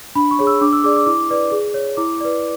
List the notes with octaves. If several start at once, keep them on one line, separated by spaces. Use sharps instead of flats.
D4 B5
C#6
G#4 C#5
E6
D4 D6
E6
G#4 D5 D6
D6
E4 D6
B4 D5
G#4
C#5
E4 D6
B4 D5